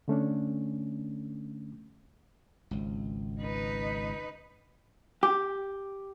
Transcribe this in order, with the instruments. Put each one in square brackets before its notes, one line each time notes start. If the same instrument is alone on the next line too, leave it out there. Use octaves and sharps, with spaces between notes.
[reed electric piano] D3 A3 C#4 D4
[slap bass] G#1 C#2
[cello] D#4 B4
[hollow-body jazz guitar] G4 [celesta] D6